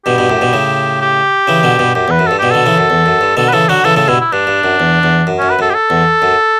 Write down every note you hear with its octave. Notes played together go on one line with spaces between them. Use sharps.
G2 B2 G4
G2 B2
F#2 A2
G2 B2
A2 C#3
G4
C#3 E3
B2 D3
G2 B2
F#2 G4
E2 B4
F#2
G2 A4
G2 B2 G4
B2 D3 A4
C#3 E3
F#2
E2
F#2
G2
B2 D3 A4
B4
C#3 E3 A4
D3 F#3 F#4
C#3 E3 A4
A2 C#3 A4
G2 B2 E4
E4
G2 D4
G2
F#2
E2
E2
F#2
F#2 C#4
B4
F#2 A4
G4
A4
E2
F#2